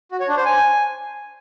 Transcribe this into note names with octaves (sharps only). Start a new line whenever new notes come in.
F#4
C#5
D4
C5
G#5